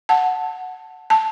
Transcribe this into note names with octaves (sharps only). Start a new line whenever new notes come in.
F#5 A5
A5